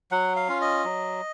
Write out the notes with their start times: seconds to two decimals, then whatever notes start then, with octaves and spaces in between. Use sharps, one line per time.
0.11 F#3 F#5
0.36 F5
0.48 C#4 F4
0.61 D#5
0.85 F#3